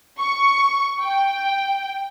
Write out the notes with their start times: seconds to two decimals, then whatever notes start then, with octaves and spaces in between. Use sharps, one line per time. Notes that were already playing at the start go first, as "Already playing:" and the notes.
0.19 C#6
1.00 G5